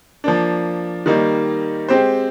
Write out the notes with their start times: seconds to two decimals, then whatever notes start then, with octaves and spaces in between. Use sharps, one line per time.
0.24 F3 A#3 D4
1.06 D#3 G3 A#3 D#4
1.88 G#3 C4 G4 C5